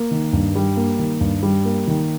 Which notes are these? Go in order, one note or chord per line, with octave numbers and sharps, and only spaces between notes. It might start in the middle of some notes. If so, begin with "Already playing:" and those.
Already playing: A#3
D#3
G2
G3
A#3
D#3
G2
G3
A#3
D#3